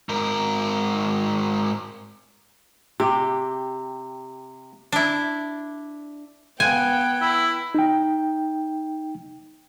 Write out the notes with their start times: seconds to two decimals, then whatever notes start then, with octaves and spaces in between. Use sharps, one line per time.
0.09 G#2 A#4
3.00 C3 G4
4.92 D4 E4
6.60 B3 G5 G#5 F#6 G#6
7.21 E4
7.75 D#4 G5